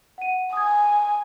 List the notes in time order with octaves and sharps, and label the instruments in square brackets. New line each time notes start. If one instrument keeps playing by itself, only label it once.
[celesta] F#5 D#7
[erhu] G#5 [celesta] D#6 G#6